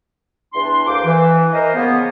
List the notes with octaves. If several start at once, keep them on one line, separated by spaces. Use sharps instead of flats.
E2 D4 C6
D2 A#3 C5 D6
E3
A#4 C5 D#5
C#3 F3 A#3 B3